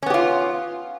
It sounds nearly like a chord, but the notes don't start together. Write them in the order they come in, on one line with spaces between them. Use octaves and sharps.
C#4 B3 G4 F4